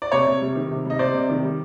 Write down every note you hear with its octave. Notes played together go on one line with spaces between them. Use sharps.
D5
C3 C#5
C3
G3
D#3
C3
G3 D#5
C3 C5 D5
C3
D#3
G3